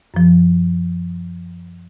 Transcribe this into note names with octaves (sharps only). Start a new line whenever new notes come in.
F#2 F3